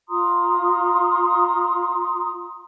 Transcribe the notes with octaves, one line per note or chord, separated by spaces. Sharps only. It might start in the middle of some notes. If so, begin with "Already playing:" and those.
F4 A#5 C6 D#6